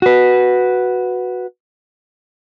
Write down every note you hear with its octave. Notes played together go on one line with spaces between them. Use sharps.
F#4 B4